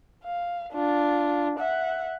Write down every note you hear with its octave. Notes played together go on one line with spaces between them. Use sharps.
F5
D4 F4
E5 F#5